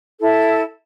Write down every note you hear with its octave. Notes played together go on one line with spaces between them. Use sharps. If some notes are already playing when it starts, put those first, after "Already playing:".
E4 A4